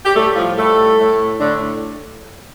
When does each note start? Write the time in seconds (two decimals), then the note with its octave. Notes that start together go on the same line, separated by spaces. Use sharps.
0.05 G4
0.15 A2 G3 A3 A4
0.35 F3 F4
0.56 A2 G3 A3 A4
0.99 A2 A3
1.39 A2 D3 A3 D4